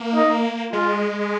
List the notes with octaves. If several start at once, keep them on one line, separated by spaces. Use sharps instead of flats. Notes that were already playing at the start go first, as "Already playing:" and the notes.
Already playing: A#3
D#4
G#3 F4